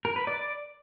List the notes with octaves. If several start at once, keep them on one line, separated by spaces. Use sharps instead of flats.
A#4
B4
D5